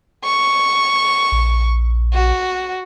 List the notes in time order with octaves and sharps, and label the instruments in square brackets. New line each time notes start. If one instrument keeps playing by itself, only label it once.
[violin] C#6
[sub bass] A#1
[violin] F#4